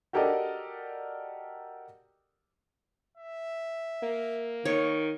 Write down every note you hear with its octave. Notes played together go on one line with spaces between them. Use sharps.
F#4 G4 A4 A#4 D5 D#5
E5
A#3
D#3 C#5